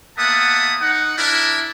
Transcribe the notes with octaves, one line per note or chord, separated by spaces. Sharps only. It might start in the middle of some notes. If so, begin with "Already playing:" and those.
A#3 B3 E5 F#5 A5 D#6
D#4 F#5
D4 E4 A#4